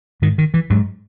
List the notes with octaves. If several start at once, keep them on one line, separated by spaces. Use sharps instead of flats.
G#2 D#3
D#3
E3
G#2 F#3